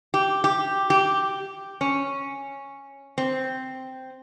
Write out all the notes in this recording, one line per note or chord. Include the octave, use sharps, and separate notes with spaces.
G4
G4
G4
C#4
C4